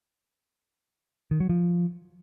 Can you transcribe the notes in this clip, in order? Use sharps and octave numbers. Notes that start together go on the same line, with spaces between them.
D#3
F#3
F3